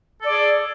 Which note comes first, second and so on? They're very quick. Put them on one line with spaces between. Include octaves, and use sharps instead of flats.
A4 D5 G#4